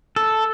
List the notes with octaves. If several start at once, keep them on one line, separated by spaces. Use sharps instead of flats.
A4